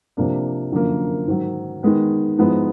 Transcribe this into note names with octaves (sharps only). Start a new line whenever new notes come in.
C3 F3 A#3 D4
F#2 D3 F3 A#3
G#2 D#3 F#3
D#3 G#3 B3
G#2 F3 G#3 B3 E4